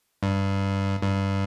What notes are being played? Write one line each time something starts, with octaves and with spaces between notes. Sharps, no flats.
G2
G2